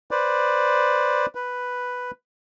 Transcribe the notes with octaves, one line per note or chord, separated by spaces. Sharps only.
B4 C5 D5
B4